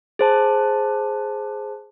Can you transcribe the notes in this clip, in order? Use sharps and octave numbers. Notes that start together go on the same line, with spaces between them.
G#4 C5 A5